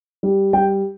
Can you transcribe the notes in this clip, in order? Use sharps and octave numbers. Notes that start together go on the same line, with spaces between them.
G3
G3 G5